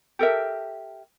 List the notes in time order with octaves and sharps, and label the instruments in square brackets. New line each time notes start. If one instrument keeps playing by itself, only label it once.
[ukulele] G4 A4 A#4 E5